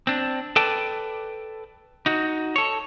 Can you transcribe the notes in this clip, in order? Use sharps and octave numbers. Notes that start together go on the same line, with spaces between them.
C4 D4
A4 B4 D5 G5 A5
D#4 F#4
A4 C#5